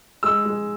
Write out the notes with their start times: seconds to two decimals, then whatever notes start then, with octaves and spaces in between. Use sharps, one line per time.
0.23 G#3 E6
0.45 G#3